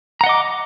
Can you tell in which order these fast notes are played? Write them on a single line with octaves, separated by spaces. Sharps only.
A#5 F#5 D#5 D6